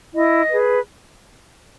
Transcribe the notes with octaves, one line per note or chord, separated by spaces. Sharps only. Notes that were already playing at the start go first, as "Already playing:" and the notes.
E4 D#5
G#4 B4